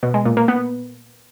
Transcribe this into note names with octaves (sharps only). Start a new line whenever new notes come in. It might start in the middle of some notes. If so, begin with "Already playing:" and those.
B2
G#3
A#2
A#3
B3